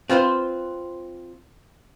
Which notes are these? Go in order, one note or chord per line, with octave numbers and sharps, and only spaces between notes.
C4 F4 B4 C5